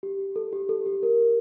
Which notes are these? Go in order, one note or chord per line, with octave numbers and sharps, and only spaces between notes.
G4
A4
G4
A4
G4
A#4